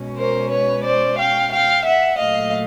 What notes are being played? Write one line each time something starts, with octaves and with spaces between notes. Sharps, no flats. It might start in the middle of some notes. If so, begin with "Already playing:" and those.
Already playing: B2 G#3 C#4
A#4 C5
B4 C#5
C5 D5
F5 G5
F5 G5
E5 F#5
A#2 F#3 A3 D#5 F5